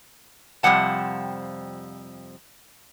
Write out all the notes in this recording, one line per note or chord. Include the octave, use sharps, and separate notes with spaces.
F2 C3 F3 G3 F#5 A5